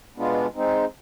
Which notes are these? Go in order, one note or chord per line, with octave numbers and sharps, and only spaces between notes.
B2 G#3 B3 D4 F4
G#3 C4 D#4